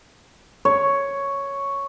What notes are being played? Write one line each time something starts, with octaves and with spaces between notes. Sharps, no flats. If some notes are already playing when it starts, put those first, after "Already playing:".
C#5